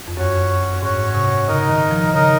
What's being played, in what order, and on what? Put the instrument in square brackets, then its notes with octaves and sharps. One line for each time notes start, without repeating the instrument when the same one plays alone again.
[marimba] F2
[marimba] F#2 [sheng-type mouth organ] C#4 F#4 C#5
[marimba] G#2 [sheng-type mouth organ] C#4 F#4 C#5
[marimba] C3
[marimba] C#3 [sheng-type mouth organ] D#4 A#4 D#5
[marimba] D#3
F3
[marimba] C#3 [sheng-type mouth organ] D#4 A#4 D#5